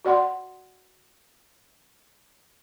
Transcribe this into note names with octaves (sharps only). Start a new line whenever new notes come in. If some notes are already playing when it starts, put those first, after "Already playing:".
F#4 D5 F#5 C6